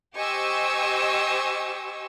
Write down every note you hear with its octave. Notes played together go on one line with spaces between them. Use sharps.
G4 C5 D#5 G#5 C#6 E6